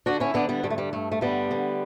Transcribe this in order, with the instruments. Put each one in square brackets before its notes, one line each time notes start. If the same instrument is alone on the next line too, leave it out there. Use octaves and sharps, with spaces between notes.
[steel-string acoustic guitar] D3 D4 F#4
C#4 E4
D3 B3 D4
G3 B3
G2 G3
A3
G3
G2 A3
A3
D3 G3 B3
D3